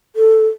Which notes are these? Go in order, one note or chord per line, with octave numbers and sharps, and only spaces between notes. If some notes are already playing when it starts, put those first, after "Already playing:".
A4